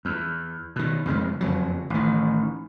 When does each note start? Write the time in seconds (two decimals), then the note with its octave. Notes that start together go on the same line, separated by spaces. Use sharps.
0.05 E2
0.76 B2 D#3
1.06 F2 C#3 F#3 G#3
1.41 F#1 F2 F#3
1.90 A1 D#3